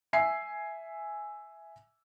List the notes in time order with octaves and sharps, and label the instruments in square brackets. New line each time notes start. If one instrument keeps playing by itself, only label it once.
[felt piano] E5 G#5 C7